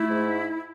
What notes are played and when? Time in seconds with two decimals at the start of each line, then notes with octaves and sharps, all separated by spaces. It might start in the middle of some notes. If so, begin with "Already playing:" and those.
Already playing: A3 E4
0.10 G#2